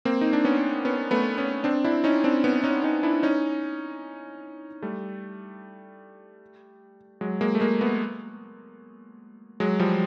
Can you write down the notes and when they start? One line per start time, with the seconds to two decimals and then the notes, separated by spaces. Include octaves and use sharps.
0.05 A#3 C4
0.21 D#4
0.33 D4
0.44 B3 C#4
0.85 B3 C#4
1.11 A3 B3
1.38 B3 C#4
1.64 C4 D4
1.84 D4 E4
2.04 C#4 D#4
2.24 C4 D4
2.44 B3 C#4
2.64 C#4 D#4
2.84 C#4 D#4
3.03 D4 E4
3.23 C#4 D#4
4.82 G3 A3
7.21 F#3 G#3
7.41 G#3 A#3
7.55 A3
7.61 G#3 A#3
7.81 A3 B3
9.60 F#3 G#3
9.79 F3 G3